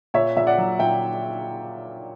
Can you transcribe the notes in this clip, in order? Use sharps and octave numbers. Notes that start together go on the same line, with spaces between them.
A#2 C#5 E5
A#2 E5
D5 F#5
F#3
A#2 E5 G5